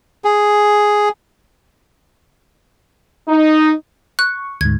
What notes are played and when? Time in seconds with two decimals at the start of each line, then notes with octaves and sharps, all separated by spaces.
0.25 G#4
3.29 D#4
4.19 C#6 F#6
4.61 D2 G#2 G#6